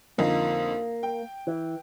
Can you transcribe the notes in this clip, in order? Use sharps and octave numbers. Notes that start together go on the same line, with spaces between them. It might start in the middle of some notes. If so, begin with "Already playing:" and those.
F2 D3 A#3 D#4
G5
E3